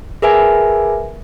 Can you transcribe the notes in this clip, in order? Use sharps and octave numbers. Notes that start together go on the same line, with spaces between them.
G#4 A#4 B4 E5 G#5